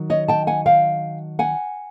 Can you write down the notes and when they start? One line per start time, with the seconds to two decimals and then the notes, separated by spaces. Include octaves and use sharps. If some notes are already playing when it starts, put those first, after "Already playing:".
Already playing: D#3 F#3
0.10 C#5 D#5
0.28 G5 A5
0.47 F#5 G#5
0.66 F5 G5
1.39 F#5 G#5